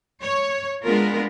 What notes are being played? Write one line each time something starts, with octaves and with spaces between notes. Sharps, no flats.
C#5
G#3 B3 D4 F4 A#4